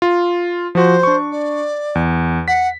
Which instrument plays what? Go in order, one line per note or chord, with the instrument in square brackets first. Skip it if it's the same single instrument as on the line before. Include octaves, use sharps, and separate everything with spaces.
[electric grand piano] F4
[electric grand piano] F3 F#4 [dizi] C5
[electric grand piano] D4 C#6
[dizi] D5
[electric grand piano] E2
[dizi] F#5 [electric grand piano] B6